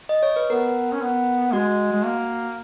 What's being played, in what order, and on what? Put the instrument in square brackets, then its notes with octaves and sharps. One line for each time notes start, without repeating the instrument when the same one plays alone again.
[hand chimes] D#5
C#5
B4
[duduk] B3 [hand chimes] A#4
[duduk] C#4
B3
[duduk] G#3 [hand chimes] F#4
[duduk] G#3
A#3